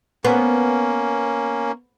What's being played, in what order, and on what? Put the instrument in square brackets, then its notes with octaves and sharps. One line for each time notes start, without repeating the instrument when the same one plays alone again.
[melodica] A#3 C#4 [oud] B3